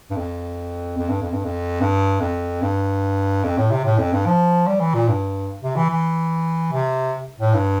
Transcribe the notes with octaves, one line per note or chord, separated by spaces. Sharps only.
G2
F2
F2
G2
F2
G2
F2
G2
F2
G2
F2
A2
C3
A2
F2
G2
F3
G3
E3
A#2
G2
C3
E3
E3
C3
A2
G2